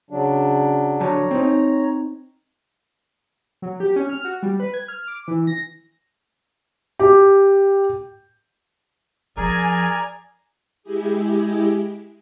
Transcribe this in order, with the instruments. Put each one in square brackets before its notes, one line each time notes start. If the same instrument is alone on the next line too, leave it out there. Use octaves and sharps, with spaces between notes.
[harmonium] C#3 F#3 D4
[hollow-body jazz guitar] D3 F#3 A5 [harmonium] C#5 A#5
[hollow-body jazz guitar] C4 D#4
[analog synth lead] F#3
G4
C#4
F6
F#4
G3
B4
G#6
F6
D6
E3
A#6
[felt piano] G4
[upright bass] F2 F3 [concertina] G#4 A#4 [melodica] D5 A#5 [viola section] G#5
[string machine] G#3 E4 G4 G#4